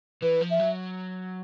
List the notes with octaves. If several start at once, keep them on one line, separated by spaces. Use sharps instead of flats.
E3 B4
F3
E5
F#3